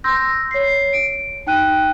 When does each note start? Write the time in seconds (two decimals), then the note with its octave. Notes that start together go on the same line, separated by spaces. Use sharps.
0.04 C6 E6 G6 A#6
0.51 C#5 C7
0.93 D7
1.47 D#4 G5 F#6 D#7